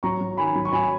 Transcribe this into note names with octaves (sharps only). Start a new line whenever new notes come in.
F#3 A#5 C#6
F#3
D#3 G#5 B5
F#3
C#6
F#3 G#5 B5